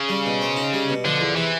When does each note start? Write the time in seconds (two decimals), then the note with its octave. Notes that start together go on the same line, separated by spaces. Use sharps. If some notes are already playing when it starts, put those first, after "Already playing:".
Already playing: C#3
0.09 G3
0.26 B2
0.41 C4
0.56 D#4
0.73 G3
0.89 B2
1.05 D3 F3
1.20 E2
1.36 C3 E3